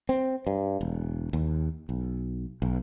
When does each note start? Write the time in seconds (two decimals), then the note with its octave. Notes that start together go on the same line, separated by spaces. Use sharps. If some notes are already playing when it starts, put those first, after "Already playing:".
0.09 C4
0.47 G2
0.81 E1
1.33 D#2
1.89 B1
2.62 B1